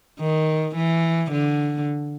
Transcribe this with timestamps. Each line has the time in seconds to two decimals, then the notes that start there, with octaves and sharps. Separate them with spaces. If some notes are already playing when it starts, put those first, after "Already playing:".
0.20 D#3
0.76 E3
1.32 D3